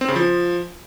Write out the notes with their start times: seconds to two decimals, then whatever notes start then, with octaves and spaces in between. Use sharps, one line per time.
0.01 C4
0.08 C#3
0.16 F3